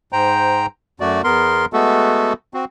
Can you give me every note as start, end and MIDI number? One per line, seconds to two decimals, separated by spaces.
0.13 0.66 44
0.13 0.66 72
0.13 0.66 79
0.13 0.66 82
1.00 1.22 42
1.00 1.22 57
1.00 1.22 66
1.00 1.22 74
1.24 1.66 40
1.24 1.66 59
1.24 1.66 70
1.24 1.66 84
1.73 2.33 56
1.73 2.33 57
1.73 2.33 59
1.73 2.33 66
1.73 2.33 69
2.54 2.65 60
2.54 2.65 66